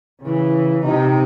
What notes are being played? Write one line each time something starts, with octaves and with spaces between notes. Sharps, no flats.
C#3 E3
C3 D#4